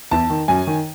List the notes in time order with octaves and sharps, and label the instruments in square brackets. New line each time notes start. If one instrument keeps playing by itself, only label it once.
[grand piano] E2 A5
D#3
F#2 G#5
D#3